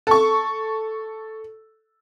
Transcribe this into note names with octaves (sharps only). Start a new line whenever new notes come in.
A4 C#6